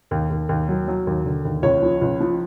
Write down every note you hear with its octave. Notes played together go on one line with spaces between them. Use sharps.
D#2
D#2
D#2
F#3
F#3
D#2
D3
D#2
C#2 C#5
F3
C#2
F3